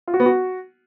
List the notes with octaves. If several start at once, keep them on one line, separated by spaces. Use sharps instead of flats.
F4
F#4
B3
F#4